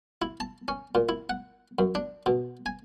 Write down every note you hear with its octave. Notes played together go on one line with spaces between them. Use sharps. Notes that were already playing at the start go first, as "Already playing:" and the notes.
E4
A5
C#4
A#2
E4
F#5
F#2
D4
B2
G#5